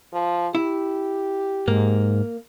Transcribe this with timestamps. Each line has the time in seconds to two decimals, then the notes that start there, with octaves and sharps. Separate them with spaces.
0.13 F3
0.55 E4 G4
1.68 G#2 A#3